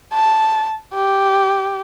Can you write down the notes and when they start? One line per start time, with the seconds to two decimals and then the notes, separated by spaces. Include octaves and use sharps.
0.13 A5
0.94 G4